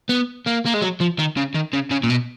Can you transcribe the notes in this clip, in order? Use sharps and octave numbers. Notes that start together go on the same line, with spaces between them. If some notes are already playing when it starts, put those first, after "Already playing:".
B3
A#3
A#3
G#3
F#3
F3
D#3
C#3
D#3
C#3
C#3
A#2
B2